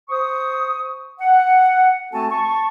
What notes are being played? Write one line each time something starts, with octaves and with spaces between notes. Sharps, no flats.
C5 C#6 D#6
F#5
A3 C4 F#4 A4 G#5 A5
A5 C#6